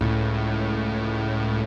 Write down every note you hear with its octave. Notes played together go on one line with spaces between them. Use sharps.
C#2 A2